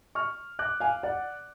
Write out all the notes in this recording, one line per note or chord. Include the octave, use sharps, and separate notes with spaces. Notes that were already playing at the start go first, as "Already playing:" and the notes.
C#6 F6
D6 F#6
F5 G#5
D5 F#5